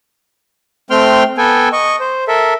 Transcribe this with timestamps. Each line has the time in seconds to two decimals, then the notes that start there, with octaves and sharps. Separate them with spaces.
0.90 A3 C4 G5 C6 F6
1.38 B3 A4 G5 G#5
1.72 D#5 C#6
2.00 C5
2.28 A4 A#4 E5